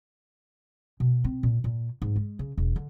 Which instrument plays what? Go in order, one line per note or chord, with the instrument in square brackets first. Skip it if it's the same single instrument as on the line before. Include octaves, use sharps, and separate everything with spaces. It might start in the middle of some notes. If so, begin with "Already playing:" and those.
[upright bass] B2
C4
A#2
A#2
G#2
G#3
C#3
E1
D3